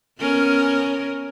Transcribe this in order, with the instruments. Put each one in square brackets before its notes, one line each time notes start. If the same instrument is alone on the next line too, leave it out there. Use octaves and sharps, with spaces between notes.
[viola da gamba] B3 C#4 A#4